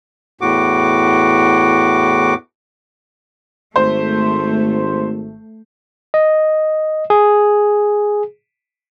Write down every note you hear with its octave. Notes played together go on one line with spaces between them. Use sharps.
E2 A2 F#4 D6
G#1 A3 C5
D#5
G#4